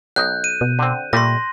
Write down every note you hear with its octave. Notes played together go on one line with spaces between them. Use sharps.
B1 D#5 F#6 G6
D#7
B2
D3 C4
A#2 G3 A3 C6 A#6